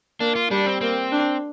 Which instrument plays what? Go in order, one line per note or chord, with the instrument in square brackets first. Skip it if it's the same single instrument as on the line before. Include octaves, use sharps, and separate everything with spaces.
[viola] A#3 [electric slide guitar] D4
[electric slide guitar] F4
[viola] G3 [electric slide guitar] D4
[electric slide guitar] C4
[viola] A#3 [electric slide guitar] C4
[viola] D4